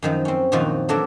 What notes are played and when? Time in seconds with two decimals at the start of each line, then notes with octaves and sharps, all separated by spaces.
0.02 F#2 D#3 F3
0.25 C4 C#4
0.52 F#2 A#2 D#3 F3 F4 F#4
0.88 E3 F#3 A3 D4 A4 A#4